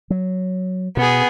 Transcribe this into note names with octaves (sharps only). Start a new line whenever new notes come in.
F#3
B2 B3 G#4